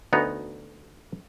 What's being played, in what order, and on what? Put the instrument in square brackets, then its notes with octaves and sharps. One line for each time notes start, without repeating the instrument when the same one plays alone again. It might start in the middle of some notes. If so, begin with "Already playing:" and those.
[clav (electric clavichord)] D2 B3 D#4 F#4 A#5